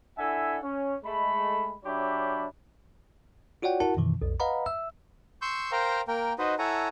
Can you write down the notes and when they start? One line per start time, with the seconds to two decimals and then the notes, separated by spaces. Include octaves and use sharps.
0.17 D4 E4 A4 E5 F#5 G#5
0.63 C#4
1.04 G#3 A3 B5
1.84 F#3 D4 G4 C#5 E5 B5
3.62 F4 F#4 C#5 D5 F#5 G5
3.80 E4 F#4 A#4 F#5 A5
3.97 F#2 B2 D#3 E3
4.22 B1 F2
4.40 B4 D#5 F5 F#5 A#5 B5
4.66 E5 E6
5.42 C6 C#6 E6 G6
5.72 A#4 C5 F5 G5 A#5
6.08 A#3 A#4 G5
6.39 D#4 F#4 B4 C5 D#5
6.59 E4 A4 C#5 F#5 G#5 A#5